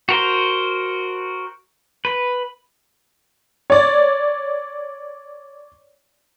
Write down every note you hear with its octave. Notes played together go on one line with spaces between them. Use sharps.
F#4 A#4 C5
B4
C#5 D5